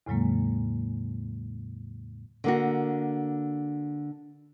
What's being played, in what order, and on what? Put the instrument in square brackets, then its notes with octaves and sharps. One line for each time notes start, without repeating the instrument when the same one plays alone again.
[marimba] E2 A2 C#3 F#3 G#3 A#3
[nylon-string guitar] D3 A#3 F#4